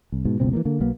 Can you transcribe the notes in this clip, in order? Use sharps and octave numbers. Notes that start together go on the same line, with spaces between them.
C2
G#2 B2
F#1 C#2 B2 C4
E3 G3 A#3
D3 A#3
B1 F#3 A#3 B3